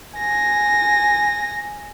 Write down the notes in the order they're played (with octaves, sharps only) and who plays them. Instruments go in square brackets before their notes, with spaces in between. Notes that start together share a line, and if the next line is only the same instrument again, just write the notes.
[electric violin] G#5 A#6